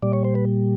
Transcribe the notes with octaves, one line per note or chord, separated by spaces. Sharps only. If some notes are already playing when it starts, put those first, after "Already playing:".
A#2 G3 D5
C#5
C5
B4